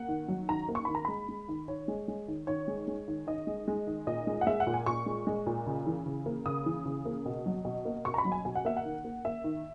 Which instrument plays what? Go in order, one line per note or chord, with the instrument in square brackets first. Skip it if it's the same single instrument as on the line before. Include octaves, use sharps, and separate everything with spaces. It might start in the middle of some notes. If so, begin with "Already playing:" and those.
Already playing: [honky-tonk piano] A#3 F#5
D#3
F#3
D#3 A#5
A#3
C#6
D#3 B5
A#5
G#3 B5
G#3
D#3
D#3 C#5
G#3
G#3
D#3
D#3 C#5
G#3
G#3
D#3
D#3 D#5
G#3
G#3
D#3
A#2 D#5
G#3
F#5
G#3 E5
F#5
A#2
G#5
A#2 C#6
G#3
G#3
A#2
C#3
E3
C#3
A#3
C#3 D#6
E3
C#3
A#3
B2
F#3
B2
A#3
B2 C#6
A#5
B5
F#3
G#5
B2 G#5
F#5
A#3 E5
F#5
D#3
A#3
A#3 E5
D#3